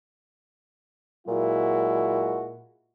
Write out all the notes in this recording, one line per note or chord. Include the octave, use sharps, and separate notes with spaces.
A#2 F#3 G#3 E4 F#4